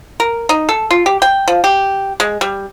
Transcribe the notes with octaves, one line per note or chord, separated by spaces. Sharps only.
A#4
D#4
A4
F4
G4
G5
F3
G4
G#3
G3